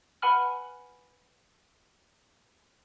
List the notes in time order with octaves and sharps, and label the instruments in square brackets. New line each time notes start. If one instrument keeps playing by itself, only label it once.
[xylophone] B4 F#5 G#5 B5 F6